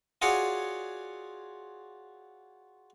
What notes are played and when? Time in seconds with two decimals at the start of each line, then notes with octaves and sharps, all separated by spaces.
0.22 F4 F#4 G#4 C#5 D5 F#5